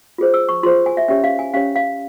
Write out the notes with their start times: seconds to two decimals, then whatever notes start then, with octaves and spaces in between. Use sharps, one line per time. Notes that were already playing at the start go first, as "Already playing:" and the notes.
0.18 F4 G#4 C5
0.34 E6
0.49 C#6
0.63 F4 G#4 C5 C6
0.86 G#5
0.97 E5
1.08 C#4 G4 C#5 E5
1.24 F5
1.39 G#5
1.54 C#4 G4 C#5 F5
1.76 F5